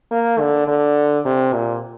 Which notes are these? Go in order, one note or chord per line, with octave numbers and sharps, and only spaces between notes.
A#3
D3
D3
C3
A#2